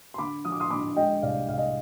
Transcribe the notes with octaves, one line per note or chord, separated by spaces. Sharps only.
C6
D3 B5 D6
F3 D#6
D6
C6 D#6
D3 B5 D6
G#3 D#5 G5
C2 D5 F5
C2 F5
D#5